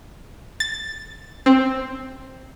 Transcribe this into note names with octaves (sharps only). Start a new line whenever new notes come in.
A6
C4